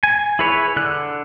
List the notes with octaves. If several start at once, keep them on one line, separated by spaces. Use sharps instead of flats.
G#5
E4 G#4 B4 C#5
D3 F#6